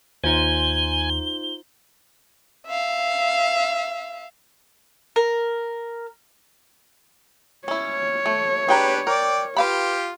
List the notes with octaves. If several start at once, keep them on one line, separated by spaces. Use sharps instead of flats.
D#2 D#4 F4 C5 G#5 G7
E5 F5
A#4
C#4 E4 C#5
A3
D4 G4 G#4 B4 G5 A#5
A#4 D5 G5
F4 G4 B4 F5 B5